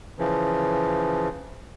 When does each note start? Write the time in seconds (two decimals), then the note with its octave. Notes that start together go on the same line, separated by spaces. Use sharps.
0.19 C#3 E3 F3